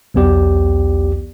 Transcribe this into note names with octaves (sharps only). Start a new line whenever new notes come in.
B1 E2 B3 G4 D5